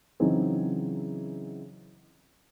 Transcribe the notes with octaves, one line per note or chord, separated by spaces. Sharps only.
C#3 E3 F#3 C4 D#4 G#4